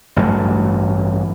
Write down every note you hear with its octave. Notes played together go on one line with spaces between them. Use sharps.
A1 G2 F#3 A3